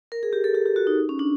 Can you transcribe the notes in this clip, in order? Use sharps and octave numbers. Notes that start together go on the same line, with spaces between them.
A#4
G#4
G4
A4
G4
G4
F#4
D#4
C#4
D4